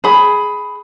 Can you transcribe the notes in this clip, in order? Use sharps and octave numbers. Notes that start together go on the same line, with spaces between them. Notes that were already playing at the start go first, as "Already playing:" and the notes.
G#4 B5